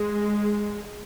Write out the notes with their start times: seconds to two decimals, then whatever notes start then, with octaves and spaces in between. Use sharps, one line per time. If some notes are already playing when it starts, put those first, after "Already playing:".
Already playing: G#3